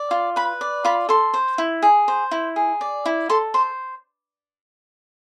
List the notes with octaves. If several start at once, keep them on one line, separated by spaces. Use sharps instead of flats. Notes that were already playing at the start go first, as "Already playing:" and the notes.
Already playing: D5
F4
B4 B5
D5
F4 B5
A4 C6
C5
E4
G#4
C5
E4
G#4
D5
E4
A4 C6
C5 C6